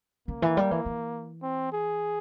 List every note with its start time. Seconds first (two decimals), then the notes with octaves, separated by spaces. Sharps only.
0.28 C#3 A#3
0.42 E3
0.57 G3
0.71 E3
0.86 E3
1.43 C4
1.73 G#4